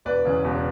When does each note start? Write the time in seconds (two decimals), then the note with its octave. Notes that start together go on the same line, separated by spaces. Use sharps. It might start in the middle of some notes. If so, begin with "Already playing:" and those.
0.05 E1 B4 D5
0.25 E2 C#3
0.44 E1